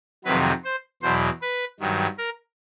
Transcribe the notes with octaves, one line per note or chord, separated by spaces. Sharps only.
F2 C3 D#3 F#3 B4
C5
E2 B2 F#3 C5
B4
G2 D#3 F#3
A#4